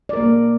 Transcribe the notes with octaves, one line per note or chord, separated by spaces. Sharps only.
A#3 A#4 D5